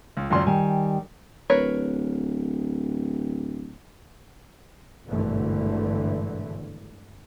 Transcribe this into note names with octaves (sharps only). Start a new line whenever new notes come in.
C#2
C#2 F#2 D#3 D5 C6
D#3 G3 G#5
D1 A#4 B4 C#5
G#1 G2 B2 D3 E3 A3